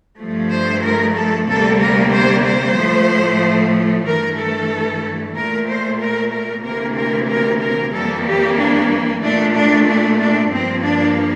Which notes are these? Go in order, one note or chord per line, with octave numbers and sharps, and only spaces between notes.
G2 F3 A3
C5
A#4
A4
D2 C3 G3 A#3 A4
A#4
C5
C5
A2 F3 A3
G2 E3 A3 A#4
A4
A#2 A3 A#4
C5
A#4
A#4
D2 C3 E3 A#3 A#4
A#4
A#4
A#4
F2 E3 G3 A#3 A4
G4
D4
A#2 A3 D4
D4
D4
D4
G2 F3 A#3 C4
D4